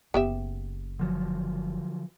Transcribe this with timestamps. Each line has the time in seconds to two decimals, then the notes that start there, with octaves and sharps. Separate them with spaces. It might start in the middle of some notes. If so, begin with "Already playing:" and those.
0.14 F#1 B3 G4 E5
0.99 D3 F3 F#3